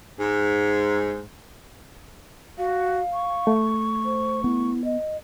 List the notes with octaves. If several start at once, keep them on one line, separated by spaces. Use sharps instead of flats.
G#2
F#4 F5
C#6
A3
C5
B3 E4
D#5